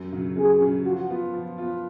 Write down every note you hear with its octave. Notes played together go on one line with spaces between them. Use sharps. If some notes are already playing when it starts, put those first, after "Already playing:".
Already playing: F#2
C#3 F#3
F#2 G#4
C#3 F#3
F3 F#4
B3 F4
F3
B3 F4